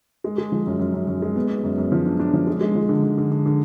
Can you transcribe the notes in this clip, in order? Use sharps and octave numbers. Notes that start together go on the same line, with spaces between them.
G#3
G#3
F3
F#2
F#2
F#2
F#2
G#3
B3
B3
F#2
F#2
F3
D4
D4
F3
G#3
G#3
F3
D3
D3
D3
D3
D3